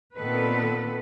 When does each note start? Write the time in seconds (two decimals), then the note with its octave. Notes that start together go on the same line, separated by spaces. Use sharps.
0.17 A#2 D#3 B3 C4 A4 B4